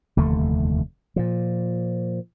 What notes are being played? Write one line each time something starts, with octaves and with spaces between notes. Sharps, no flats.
F1 D#2 D3 A3
A#2 F3